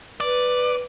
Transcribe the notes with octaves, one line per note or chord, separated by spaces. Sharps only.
B4 D5